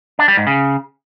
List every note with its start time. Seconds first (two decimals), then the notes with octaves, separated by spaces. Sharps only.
0.19 D4
0.28 G3
0.37 G#2
0.47 C#3